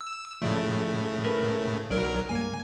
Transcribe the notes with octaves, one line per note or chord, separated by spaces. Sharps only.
E6
A2 C#3 F3 A3 D5
A#4 B4
B1 F#3 A#4 D5
C#2 G2 A#3 G#5